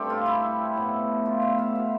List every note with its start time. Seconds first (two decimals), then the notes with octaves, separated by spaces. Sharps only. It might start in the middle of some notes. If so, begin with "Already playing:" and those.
Already playing: G2 D3 A3 C4 G4 A4
0.10 F4
0.26 E4
0.76 A2 F3 B3
1.26 F4
1.42 E5
1.59 F5
1.75 B2 B3 E5